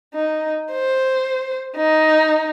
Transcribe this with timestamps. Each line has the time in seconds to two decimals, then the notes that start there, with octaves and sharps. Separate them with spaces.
0.14 D#4
0.72 C5
1.76 D#4